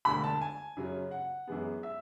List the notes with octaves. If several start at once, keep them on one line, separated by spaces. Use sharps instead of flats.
E1 D2 D3 B5
A5
G#5
F#2 C#3 F#3
F#5
F#2 E3 G#3 B3
E5